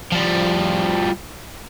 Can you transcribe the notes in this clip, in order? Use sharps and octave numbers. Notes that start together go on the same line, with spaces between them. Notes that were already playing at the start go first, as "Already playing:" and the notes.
F3 G3